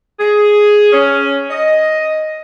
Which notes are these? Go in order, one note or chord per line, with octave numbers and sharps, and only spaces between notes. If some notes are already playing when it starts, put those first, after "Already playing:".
G#4
C#4
D#5